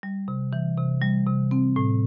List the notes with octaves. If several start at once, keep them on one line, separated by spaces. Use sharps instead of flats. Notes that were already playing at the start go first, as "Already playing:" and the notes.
G3
C3
E3
C3
G3
C3
C4
A2